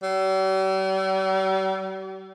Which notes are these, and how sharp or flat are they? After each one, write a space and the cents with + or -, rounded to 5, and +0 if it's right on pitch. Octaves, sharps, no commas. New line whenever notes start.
G3 -45